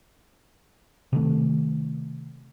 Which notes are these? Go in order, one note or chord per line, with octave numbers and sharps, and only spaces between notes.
C3 D#3 A3